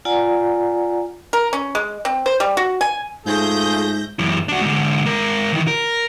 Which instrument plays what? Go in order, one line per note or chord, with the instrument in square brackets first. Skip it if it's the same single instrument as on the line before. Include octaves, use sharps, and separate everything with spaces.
[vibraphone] F4 D5 F#5 G#5 A#5
[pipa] A#4
C#4
G#3
C4
C5
G3
F#4
G#5
[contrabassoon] G#2 [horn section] A3 F4 G#4 [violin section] E5 G6 A#6
[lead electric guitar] F#2 E3
D4 F#4
G#2 D3
G#2 A#4
D#3 E3
A#4